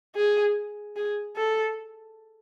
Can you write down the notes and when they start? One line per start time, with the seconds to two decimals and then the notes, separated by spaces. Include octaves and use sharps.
0.16 G#4
0.96 G#4
1.36 A4